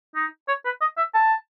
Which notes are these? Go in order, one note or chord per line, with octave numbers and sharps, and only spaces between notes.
D#4
C#5
B4
D#5
E5
A5